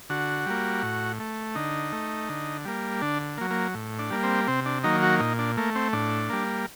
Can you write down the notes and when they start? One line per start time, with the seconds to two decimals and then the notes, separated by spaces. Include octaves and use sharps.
0.09 D3 F#4
0.46 G3 A#3
0.82 A2
1.20 A3
1.55 D3 D#4
1.92 A3
2.29 D3
2.65 G3 A#3
3.01 D3 D4
3.38 F#3 A#3
3.51 A#3
3.74 A2
3.99 D4
4.10 G3 A#3
4.23 C4
4.47 C3 C4
4.66 D4
4.83 D#3 F#3 A#3 D#4
5.02 F#4
5.20 A#2 D#4
5.39 D4
5.57 A3 A#3
5.75 C4
5.93 A2 D4
6.30 G3 A#3